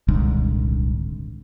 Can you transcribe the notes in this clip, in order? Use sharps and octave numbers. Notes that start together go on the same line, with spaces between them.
D#1 C2 G#2 D3